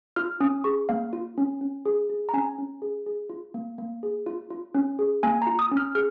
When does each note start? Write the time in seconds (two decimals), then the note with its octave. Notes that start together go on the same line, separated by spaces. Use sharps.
0.16 F4 F6
0.40 C#4 D#6
0.64 G#4 C#6
0.89 A#3 F5
1.13 F4
1.38 C#4
1.61 C#4
1.86 G#4
2.10 G#4
2.29 A#5
2.33 C#4 G#5
2.58 C#4
2.82 G#4
3.06 G#4
3.30 F4
3.54 A#3
3.78 A#3
4.03 G#4
4.26 F4
4.50 F4
4.75 C#4
4.99 G#4
5.23 A#3 G#5
5.42 A#5
5.47 F4
5.59 D#6
5.71 C#4
5.77 F6
5.95 G#4 F6